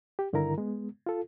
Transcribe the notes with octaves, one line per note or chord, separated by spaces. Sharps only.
G4
G2 D3 D#3 E4 A#4 A#5
G#3 B3
F4 A4